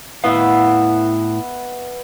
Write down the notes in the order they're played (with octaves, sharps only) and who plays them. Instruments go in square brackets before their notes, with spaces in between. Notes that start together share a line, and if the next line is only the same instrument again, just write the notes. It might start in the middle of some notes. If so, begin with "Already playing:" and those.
[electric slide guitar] A2 E4 F5 [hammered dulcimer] B3 E5